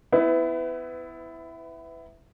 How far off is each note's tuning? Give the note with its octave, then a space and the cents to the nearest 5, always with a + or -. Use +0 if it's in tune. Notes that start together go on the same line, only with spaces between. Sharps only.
B3 +25 E4 +0 B4 +40